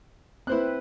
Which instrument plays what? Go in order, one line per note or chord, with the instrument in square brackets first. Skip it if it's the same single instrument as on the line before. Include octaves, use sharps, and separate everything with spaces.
[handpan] C4 B4 [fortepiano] E4 C5 F#6